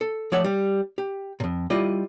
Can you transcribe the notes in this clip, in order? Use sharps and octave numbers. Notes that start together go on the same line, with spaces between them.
A4
F3 A3 C#5 D5 E5 F#5
G3
G4
F2 A#2
G3 E4 F4 D5 D#5